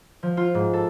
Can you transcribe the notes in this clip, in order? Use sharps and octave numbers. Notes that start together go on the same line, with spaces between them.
F3
F4
G#2
A4